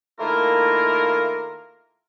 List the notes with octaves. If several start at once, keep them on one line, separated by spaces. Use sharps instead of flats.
D#3 A3 A#3 E4 F4 A#4